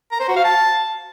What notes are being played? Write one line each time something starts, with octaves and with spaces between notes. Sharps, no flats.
A#5
C5
F#4
F5
A5